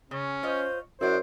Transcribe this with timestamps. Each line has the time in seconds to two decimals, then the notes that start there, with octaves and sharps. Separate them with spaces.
0.11 C#3 C#4
0.43 F4 C5 C#5 D#5
1.01 F#2 E4 F#4 C5 D5